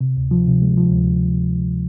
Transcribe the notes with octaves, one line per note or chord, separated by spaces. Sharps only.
C3
D2
F3
C3
G#3
F3
D2